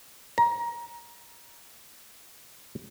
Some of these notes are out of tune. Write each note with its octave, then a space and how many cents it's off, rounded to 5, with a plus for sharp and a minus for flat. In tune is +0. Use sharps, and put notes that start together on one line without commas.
A#5 +20